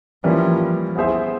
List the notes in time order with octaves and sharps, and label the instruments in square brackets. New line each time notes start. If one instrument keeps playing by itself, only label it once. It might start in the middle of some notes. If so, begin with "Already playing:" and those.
[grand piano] E3 G3 A#3 C#4 [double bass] F3
[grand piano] B3 E4 G#4 C5 E5